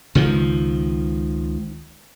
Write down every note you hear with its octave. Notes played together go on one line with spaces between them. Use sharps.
C#2 D#3 F3